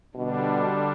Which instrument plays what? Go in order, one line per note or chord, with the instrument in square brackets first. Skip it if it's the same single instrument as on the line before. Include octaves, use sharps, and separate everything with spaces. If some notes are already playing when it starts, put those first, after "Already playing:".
[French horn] B2 [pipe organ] D3 G3 D4